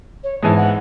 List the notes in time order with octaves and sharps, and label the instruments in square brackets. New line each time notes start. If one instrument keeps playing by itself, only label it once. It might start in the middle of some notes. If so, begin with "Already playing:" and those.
[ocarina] C#5
[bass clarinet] G#2 [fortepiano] E3 G#3 [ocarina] A5
[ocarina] F#5